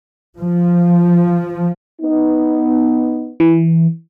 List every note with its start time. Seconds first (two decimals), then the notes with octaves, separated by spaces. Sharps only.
0.39 F3
2.02 B3 D#4
3.40 E3